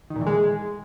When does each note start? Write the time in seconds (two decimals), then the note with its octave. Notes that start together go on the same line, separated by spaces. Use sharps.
0.10 D#3
0.16 A#2
0.21 E3
0.26 G#3